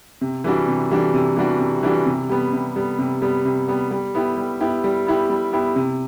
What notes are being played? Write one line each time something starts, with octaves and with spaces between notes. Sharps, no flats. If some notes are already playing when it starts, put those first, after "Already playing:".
C3
E3 G3 D4 F#4
C3
E3 G3 D4 F#4
C3
E3 G3 D4 F#4
C3
E3 G3 D4 F#4
C3
G3 B3
C3
G3 B3
C3
G3 B3
C3
G3 B3
G3
B3 E4 G4
G3
B3 E4 G4
G3
B3 E4 G4
G3
B3 E4 G4
C3